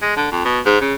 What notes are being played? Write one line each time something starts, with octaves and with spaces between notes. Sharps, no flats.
G#3
D3
F2
B2
G#2
C#3